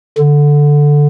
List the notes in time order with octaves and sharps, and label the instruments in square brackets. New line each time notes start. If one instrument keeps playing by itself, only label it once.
[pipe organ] D3